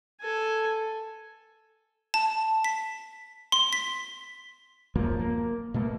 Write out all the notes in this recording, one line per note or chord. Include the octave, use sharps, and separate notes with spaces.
A4 G#5
A5
B6
C6
B6
D1 F#2 F3 A#3
A#3
B2 A3 A#3